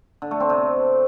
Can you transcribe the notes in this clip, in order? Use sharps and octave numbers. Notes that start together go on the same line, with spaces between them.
D3
A3
C4
C3